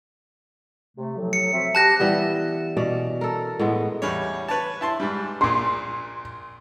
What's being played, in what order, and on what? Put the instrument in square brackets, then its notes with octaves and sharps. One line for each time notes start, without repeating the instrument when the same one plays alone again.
[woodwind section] C3 A3
A2 F3 F#3
[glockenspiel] C#7
[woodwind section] C4 F#4 E5
[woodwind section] G4 [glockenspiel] A5 F#6 A#6
[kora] E3 G3 B3
B2 C#4 D5
A4 A#4
A2 G#3 B3
[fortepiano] E2 G3 C#5
B4 C#5 A5
E4 A5 C6
G#2 G3
[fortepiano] A#1 A#2 [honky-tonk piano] C6